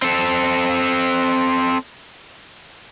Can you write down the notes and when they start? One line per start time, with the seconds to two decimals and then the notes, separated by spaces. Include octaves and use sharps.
0.02 C4 A4